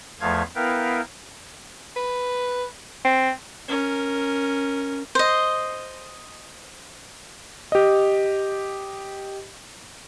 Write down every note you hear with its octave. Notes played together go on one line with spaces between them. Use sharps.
E2 F3 A3 F5 G#6
B3 E4 A#4 B4 F5 G5
B4
C4
C#4 A#4
C5 D#5
G4 D#5